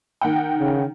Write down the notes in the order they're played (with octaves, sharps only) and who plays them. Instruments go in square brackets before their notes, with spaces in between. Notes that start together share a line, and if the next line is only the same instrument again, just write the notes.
[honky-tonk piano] D#3 F#5 G5
[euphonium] C#3